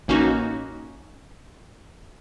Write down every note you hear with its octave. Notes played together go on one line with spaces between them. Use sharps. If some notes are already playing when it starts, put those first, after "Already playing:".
A1 A#3 C#4 D#4 F#4